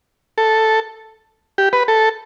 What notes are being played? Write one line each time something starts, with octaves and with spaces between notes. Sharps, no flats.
A4
G4
B4
A4